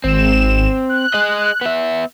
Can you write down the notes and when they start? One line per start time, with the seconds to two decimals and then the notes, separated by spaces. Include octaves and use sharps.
0.04 G#1 C4 E7
0.89 F#6
1.14 G#4 D#5
1.61 B3 E5